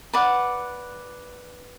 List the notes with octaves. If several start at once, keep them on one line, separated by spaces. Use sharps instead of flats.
B4 D5 F#5